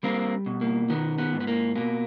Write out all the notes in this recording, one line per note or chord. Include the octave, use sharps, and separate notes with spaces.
G3 A#3 C4
B2
A#3
D#3 B3
B3
G#2
B3
A#3
B2 A#3